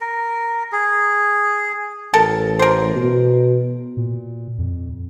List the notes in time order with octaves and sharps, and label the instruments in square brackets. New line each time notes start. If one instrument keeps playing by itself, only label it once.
[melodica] A#4
G#4
[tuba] A1 [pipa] A4 A#4
[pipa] A#4 C5
[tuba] B2
[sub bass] A#2
F2